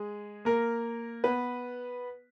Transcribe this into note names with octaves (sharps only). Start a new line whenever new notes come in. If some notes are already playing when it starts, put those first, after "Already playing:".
Already playing: G#3 G#4
A#3 A#4
B3 B4